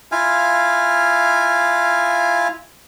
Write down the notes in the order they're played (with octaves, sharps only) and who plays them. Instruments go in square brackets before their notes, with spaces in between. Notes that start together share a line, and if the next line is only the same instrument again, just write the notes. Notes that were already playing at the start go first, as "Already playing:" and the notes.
[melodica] E4 F4 F5 G#5